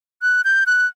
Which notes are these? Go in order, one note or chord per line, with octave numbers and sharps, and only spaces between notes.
F#6
G6
F#6